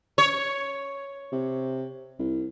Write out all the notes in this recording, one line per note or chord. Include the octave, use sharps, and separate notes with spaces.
C#5
C3
C2